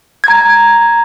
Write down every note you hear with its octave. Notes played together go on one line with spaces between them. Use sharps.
A#5 G#6